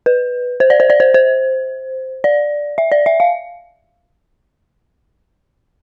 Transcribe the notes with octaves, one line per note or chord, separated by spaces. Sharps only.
B4
C5
D5
C5
D5
C5
C5
D5
E5
D5
E5
F5